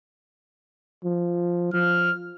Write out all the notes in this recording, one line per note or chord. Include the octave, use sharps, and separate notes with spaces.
F3
F3 F6